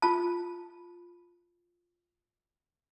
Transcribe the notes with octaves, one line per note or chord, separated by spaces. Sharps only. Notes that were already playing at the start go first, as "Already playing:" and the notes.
F4 A5